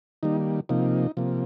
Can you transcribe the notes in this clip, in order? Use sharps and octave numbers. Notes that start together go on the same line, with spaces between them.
D#3 G3 A#3 D#4
C3 F3 A#3 D#4
C3 F3 A#3